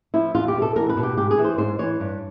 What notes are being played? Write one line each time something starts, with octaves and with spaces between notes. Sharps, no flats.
F3 E4
E2 F4
G4
B2
A4
E2 A#4
B4
B2
G4
G#2 G4
G#4
E3
C5
G#2 C5
E3 C#5
G2